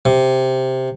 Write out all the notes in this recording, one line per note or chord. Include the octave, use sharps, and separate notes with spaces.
C3